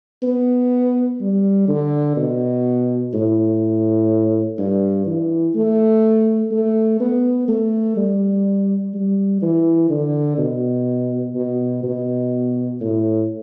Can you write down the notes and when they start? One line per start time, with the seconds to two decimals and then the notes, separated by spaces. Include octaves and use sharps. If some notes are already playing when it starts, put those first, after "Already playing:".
0.23 B3
1.21 G3
1.68 D3
2.17 B2
3.13 A2
4.58 G2
5.06 E3
5.55 A3
6.51 A3
7.00 B3
7.48 A3
7.96 G3
8.94 G3
9.42 E3
9.90 D3
10.38 B2
11.35 B2
11.83 B2
12.81 A2